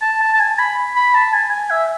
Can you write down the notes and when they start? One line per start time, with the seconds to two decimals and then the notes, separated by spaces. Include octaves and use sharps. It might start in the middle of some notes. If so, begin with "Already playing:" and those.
0.02 A5
0.21 A5
0.34 A5
0.40 G#5
0.59 B5
0.96 B5
1.15 A5
1.34 G#5
1.52 G#5
1.71 E5